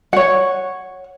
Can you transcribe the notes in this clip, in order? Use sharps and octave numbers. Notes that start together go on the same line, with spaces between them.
C#5 F#5